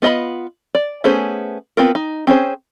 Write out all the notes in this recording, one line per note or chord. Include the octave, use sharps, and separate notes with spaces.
B3 F4 D#5 A#5 B5
D5
A3 B3 C#4 G#4 C5
B3 C4 F4 A#4
D#4
C4 C#4 G#4 C5